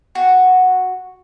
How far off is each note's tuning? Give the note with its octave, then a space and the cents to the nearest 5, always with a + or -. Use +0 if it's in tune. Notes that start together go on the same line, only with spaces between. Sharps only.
F#4 -5